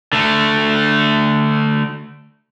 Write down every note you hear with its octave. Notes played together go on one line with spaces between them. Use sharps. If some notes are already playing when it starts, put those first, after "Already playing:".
D3 A3